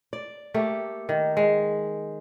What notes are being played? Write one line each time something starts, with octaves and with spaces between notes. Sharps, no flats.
D5
A3 A#3 G4
D#3
G#3